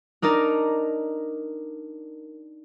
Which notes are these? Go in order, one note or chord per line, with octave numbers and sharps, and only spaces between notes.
D4 D#4 A#4 D5